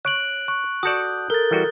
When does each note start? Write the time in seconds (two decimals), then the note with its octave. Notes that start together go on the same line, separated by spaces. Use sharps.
0.05 C#5 F#6 D7 F#7
0.48 C#6 F#6
0.83 F#4 A4 D5 D#6 G6
1.30 A4 A#4 A6 G7
1.51 E3 G3 F#4